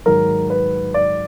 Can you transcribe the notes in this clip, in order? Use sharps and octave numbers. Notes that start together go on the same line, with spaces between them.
G#2 D#3 F#3 A#4
B4
D5